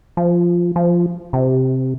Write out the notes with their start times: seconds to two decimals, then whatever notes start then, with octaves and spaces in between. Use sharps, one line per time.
0.17 F3
0.76 F3
1.33 C3